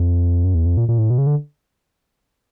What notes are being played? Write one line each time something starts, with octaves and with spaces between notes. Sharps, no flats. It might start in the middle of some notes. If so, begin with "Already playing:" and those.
Already playing: F2
F#2
E2
F2
A#2
A#2
A2
B2
C#3
D3